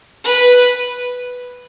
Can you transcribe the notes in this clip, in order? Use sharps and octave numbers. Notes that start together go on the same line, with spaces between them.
B4